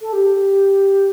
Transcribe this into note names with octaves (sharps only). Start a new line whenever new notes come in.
A4
G4